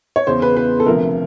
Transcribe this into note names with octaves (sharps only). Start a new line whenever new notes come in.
C#5
E2 C#3 E3 C5
B4
B4
A4
D2 C3 F3 A#4